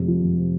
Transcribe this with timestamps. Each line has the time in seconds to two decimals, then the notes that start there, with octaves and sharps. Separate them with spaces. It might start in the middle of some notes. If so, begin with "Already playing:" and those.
Already playing: F2 C3 G#3
0.08 F3
0.23 F2
0.38 C3